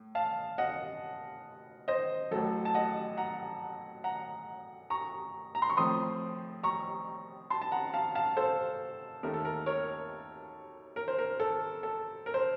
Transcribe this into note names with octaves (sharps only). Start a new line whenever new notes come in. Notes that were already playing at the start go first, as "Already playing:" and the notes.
Already playing: A2
F5 A5
D#5 F#5
C5 D#5
A1 A2 F#3 A4
A5
D#5 F#5
F#5 A#5
F#5 A#5
A#5 C#6
A#5
C6
C#6
A2 F3 C4 C6 D#6
A#5 C#6
A5 C6
A5
F#5 A#5
F5 A5
F5 A5
A4 C5
D#2 D#3 A3 A#4
A4
A#4
A#4 C#5
A#4
C5
A#4
A4
A4
A#4
C5